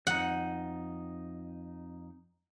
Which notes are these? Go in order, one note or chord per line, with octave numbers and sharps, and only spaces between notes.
F2 D#4 F#5